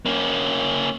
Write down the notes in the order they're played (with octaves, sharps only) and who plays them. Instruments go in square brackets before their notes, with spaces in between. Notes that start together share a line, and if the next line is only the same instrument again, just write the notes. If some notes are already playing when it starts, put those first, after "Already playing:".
[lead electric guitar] A#3 C#4